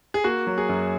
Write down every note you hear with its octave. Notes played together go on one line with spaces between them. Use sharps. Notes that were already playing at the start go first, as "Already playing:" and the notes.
G#4
A#3 F#4
F#3
G#4
F#2